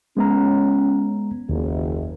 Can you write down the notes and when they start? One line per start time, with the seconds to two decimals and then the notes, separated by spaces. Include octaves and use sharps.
0.17 G#3 B3 C#4 A#5
1.49 F#1 D#2